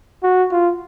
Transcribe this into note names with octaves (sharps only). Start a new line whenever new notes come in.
F#4
F4